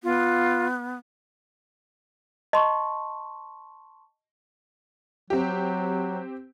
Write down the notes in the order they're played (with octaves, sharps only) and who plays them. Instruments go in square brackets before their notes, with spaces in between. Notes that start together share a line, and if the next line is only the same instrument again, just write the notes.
[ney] B3 [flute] F4
[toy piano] D#5 [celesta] A5 C6 C#6
[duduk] F#3 [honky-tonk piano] C4 G4